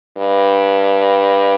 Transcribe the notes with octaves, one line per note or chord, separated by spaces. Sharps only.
G2